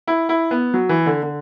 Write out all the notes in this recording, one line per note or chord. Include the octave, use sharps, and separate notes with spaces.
E4
E4
B3
F#3
E3
D3
D3